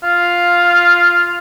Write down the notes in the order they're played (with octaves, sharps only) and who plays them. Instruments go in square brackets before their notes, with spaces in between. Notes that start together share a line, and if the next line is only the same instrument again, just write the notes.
[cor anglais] F4